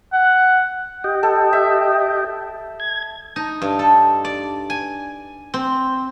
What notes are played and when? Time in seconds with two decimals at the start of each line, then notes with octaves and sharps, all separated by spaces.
0.13 F#5
1.04 G4 D#5 G5
1.23 A4
1.53 E5
2.80 G#6
3.36 D#4
3.62 G2
3.79 A4
4.25 D5
4.70 G#5
5.54 C4